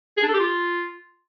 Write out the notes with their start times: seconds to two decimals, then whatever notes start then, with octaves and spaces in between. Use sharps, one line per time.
0.17 G#4
0.23 D4
0.28 A4
0.34 G4
0.39 F4